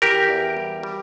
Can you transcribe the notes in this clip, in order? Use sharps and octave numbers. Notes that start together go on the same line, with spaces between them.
E3 G4 A#4
E2
G3
G3